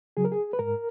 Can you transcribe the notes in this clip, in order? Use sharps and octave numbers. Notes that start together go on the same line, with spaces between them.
C#3 F#3 G#4
A#4
G#4
B4
G#2 A#4